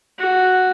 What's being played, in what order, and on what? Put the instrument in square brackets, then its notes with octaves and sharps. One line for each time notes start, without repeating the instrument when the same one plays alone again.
[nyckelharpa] F#4